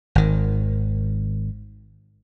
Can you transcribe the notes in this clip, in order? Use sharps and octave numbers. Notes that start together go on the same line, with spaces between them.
G#1 D#3